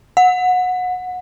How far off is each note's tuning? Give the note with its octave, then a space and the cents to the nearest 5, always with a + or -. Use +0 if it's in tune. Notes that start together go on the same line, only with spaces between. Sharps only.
F#5 -20